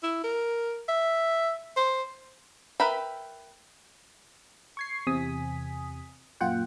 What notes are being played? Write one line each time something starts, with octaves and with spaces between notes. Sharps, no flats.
E4
A#4
E5
C5
A#4 B4 E5 G5 B5
C#6 G#6 C7
E2 C3 G#5 D#6 B6
F#2 A#2 F4 F#5 G5